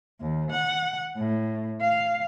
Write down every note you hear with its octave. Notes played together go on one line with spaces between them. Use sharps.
D#2
F#5
A2
F5